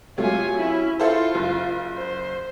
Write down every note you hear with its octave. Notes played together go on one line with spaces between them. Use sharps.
C3 F#3 A3 F4 G#5
C#4 E4
E4 F4 A4 C5
F#1
C5